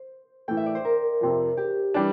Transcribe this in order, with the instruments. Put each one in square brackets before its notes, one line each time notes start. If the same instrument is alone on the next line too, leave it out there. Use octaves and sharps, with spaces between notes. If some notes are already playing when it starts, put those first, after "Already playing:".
Already playing: [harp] C5
[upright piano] A2 E3 A3 [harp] G5
[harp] E5
D5
C5
A#4
[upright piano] F2 C3 F3
[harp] G4
[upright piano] E3 G3 D4